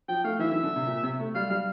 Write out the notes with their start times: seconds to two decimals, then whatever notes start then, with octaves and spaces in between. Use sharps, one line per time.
0.08 F3 G5
0.24 A3 F5
0.39 E3 E5
0.51 E3
0.63 D3
0.76 C3
0.87 A#2
1.03 C3
1.19 A3
1.35 G3 F5
1.50 G3 F5